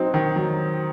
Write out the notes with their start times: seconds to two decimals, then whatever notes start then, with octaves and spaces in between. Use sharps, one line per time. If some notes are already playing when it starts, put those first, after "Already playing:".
Already playing: F#3 C4 D#4
0.14 D#3
0.36 F#3